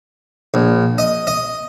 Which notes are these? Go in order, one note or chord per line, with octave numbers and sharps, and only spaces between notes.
A#1
D#5
D#5